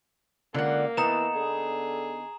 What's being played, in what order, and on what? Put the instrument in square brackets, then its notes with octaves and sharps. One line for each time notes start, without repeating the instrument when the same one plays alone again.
[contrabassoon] C#2 [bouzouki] D3 F#5 [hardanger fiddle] A#3
[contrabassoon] E3 [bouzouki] B3 D#4 [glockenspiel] A#5 E7
[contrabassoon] D3 [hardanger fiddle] G#4